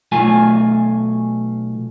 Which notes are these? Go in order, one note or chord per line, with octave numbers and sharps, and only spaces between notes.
B1 A3 F4 G#5